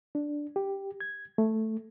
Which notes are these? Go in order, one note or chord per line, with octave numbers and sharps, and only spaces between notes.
D4
G4
G#6
A3